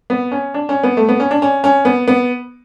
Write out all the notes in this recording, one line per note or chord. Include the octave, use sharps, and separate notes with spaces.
B3
C#4
D4
C#4
B3
A3
B3
C#4
D4
C#4
C#4
B3
B3